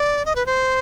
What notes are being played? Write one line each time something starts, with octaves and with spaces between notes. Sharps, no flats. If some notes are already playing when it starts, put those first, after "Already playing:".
Already playing: D5
D#5
B4
C5